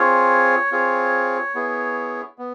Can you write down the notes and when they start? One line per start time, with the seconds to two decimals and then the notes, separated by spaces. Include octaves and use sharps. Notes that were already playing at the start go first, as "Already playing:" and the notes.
Already playing: C4 F4 G#4 C#5
0.72 C4 F4 G#4
1.55 B3 E4 G#4
2.38 B3